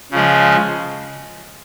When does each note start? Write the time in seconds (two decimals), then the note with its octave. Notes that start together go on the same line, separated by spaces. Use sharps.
0.12 C#3 F3 G#3